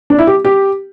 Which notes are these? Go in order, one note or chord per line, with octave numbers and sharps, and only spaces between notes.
D4
E4
G4
G4